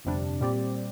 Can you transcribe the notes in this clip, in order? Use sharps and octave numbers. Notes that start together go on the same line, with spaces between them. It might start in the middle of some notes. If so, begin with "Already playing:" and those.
G1 F2 C3 G3 D4
A#2 G3 C4 G4 D5